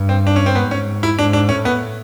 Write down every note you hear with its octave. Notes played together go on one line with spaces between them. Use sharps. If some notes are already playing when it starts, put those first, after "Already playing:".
Already playing: G2
C4
D4
C#4
C4
G#2 B3
C#4
E4
G#2 D4
D4
A2 C#4
B3